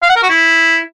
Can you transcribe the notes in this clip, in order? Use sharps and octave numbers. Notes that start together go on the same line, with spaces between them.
F5
F#5
A#4
F#4
E4